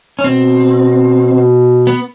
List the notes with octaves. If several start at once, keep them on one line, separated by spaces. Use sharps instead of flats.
C#4
B2 C4
B2
B3